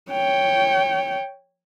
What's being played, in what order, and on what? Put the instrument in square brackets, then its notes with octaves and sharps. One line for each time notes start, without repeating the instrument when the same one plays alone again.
[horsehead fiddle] C#5 G5